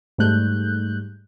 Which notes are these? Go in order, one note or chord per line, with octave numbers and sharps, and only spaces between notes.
G#2 G3 A3 F#6 G6